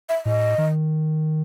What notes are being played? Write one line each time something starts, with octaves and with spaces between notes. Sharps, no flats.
E5
A2 D#5
D#3